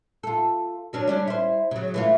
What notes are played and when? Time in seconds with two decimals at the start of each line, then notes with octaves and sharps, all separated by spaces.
0.23 F4 A4
0.93 F#3 C#4 D4
1.07 G3 C#4 D4
1.28 E4 C5
1.71 C#3 F#3
1.94 E3 A3 F4